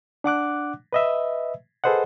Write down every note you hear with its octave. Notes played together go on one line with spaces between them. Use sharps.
D4 F#5 D6 F#6
B4 D#5 E5
G#4 A4 B4 C5 D#5 F#5